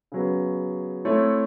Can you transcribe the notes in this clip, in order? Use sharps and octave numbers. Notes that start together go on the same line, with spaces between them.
C#3 F#3 B3
A3 C4 E4 A4 C#5